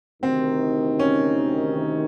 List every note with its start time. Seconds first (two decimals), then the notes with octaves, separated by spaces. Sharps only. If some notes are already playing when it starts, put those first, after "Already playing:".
0.22 D2 C3 D#3 C4
0.99 C#4